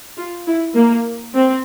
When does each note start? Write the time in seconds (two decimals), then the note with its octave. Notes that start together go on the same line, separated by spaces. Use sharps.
0.17 F4
0.47 E4
0.75 A#3
1.34 C4